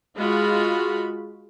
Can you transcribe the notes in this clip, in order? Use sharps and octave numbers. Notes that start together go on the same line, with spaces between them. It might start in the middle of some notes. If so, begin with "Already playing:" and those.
G#3 F4 F#4 B5